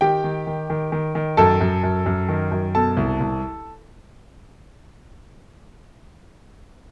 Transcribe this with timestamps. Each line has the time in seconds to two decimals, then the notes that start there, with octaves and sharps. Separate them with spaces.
0.01 D#3 G4 G5
0.24 D#3
0.47 D#3
0.70 D#3
0.92 D#3
1.15 D#3
1.37 F#2 A4 A5
1.61 F#2
1.83 F#2
2.06 F#2
2.29 D#3
2.51 F#2
2.75 B2 A4 A5
2.97 C2
3.20 C2